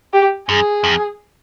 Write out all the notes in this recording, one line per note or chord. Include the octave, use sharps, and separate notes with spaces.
G4
F#2 G#4
F2